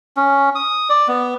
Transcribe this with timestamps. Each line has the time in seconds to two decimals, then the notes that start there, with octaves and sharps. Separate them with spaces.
0.17 C#4
0.55 D#6
0.89 D5
1.08 B3